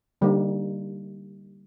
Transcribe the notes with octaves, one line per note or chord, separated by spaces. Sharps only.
D3 G3 A#3 D#4